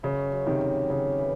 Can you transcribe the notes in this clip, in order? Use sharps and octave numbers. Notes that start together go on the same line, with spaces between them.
F#2 C#3
F#2
C3 D#3
F#2
F#2 C#3
E3